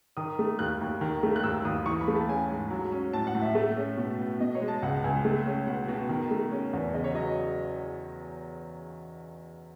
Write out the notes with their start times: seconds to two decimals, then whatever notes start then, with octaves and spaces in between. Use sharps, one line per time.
0.17 D#3 D#6
0.39 A3
0.59 D#2 F#6
0.81 D#2
1.01 D#3
1.23 A3
1.36 F#6
1.43 D#2 E6
1.65 D#2 D#6
1.86 E3 C#6
2.01 B5
2.08 A3
2.15 A5
2.28 C#4 G#5
2.50 G#2
2.70 F#3
2.92 C#4
3.13 A2 A5
3.27 F#5
3.35 A2
3.42 E5
3.55 A3
3.77 C#4
3.97 B2
4.19 B2
4.40 B2 D#5
4.55 C#5
4.61 G#3
4.68 A5
4.82 C#2 F#5
5.04 C#2 G#5
5.25 A3
5.46 C#4
5.67 B2 F#5
5.88 B2
6.09 D#3
6.31 A3
6.51 C#4
6.73 E2
6.93 C#3 D#5
7.04 C#5
7.15 F#3 D#5